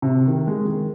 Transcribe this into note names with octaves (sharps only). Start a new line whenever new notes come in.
C3
D#3
G#3
D#3